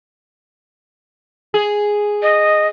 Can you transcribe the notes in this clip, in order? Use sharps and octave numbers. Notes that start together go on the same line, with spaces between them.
G#4
D#5